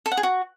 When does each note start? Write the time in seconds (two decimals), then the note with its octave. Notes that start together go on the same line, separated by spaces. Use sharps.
0.06 A4
0.12 F#5
0.17 G#4
0.23 F#4